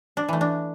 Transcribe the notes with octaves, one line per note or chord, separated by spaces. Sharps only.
D4
E3 A3
D4